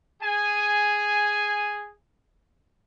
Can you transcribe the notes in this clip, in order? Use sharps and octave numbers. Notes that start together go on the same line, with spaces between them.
G#4 G#5